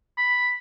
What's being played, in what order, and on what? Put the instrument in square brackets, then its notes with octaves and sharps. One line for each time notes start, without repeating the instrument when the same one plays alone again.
[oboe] B5